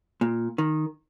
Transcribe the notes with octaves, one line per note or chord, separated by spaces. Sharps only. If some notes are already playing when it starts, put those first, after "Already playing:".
A#2
D#3